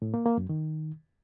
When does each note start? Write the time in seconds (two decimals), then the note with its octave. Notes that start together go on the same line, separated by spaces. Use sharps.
0.02 A2
0.14 A#3
0.26 A#3
0.37 F#2
0.49 D#3